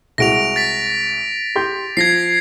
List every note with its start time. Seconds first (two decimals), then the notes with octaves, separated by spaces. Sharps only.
0.18 C2 G#3 F#4 A#6 D7 F7
0.56 A6 B6
1.55 G4 C6 G6
1.97 F3 G#6 A#6 C7